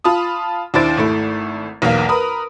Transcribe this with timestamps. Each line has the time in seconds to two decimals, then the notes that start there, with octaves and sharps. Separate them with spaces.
0.04 F4 A5 B5 D#6
0.74 D#2 D4 E4 C5 A6 D7
0.97 G#1 A3 E4
1.82 B1 E2 A#3 F5
2.09 A#4 B4 A#5 B5 D#6